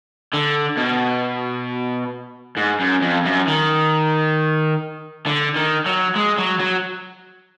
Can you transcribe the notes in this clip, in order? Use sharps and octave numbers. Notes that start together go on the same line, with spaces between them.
D3
B2
G#2
F#2
F2
F#2
D#3
D3
D#3
F#3
G#3
F#3
F#3